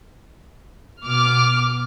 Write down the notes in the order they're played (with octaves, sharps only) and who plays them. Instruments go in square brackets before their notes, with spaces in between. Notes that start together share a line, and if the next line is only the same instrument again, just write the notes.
[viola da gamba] B2 [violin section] D6 F6